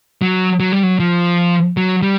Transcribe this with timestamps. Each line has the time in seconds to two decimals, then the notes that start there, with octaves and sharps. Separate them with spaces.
0.22 F#3
0.60 F#3
0.72 G3
0.83 F#3
1.00 F3
1.77 F#3
2.02 G3